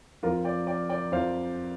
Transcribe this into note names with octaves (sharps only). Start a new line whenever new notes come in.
F2 F3 F4 A#4
D5 G5
D5 G5
D5 G5
F2 F3 C5 F5